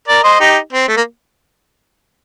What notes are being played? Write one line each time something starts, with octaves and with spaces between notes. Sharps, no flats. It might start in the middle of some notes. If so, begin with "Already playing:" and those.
A#4 D5
C5 D#5
D#4 G4
C4
A3
A#3